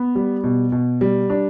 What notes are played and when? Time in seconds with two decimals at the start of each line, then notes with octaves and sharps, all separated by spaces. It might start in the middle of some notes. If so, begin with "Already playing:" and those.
Already playing: B3
0.15 G3
0.44 B2
0.72 B2
1.01 G3
1.30 D4